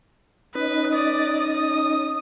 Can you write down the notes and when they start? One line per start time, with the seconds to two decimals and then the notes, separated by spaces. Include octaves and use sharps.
0.55 C#4 D#4 B4 D#5
0.92 D5 D#6
1.40 D#6